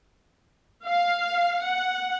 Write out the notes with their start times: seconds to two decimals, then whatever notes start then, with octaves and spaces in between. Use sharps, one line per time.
0.83 F5
1.63 F#5